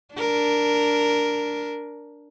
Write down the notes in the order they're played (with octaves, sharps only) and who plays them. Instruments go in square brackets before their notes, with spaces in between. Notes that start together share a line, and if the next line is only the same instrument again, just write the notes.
[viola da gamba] D4 A#4